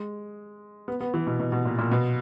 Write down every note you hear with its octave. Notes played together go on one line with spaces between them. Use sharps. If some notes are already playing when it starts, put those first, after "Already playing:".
Already playing: G#3
B3
B3
E3
B2
B2
B2
A#2
A#2
B2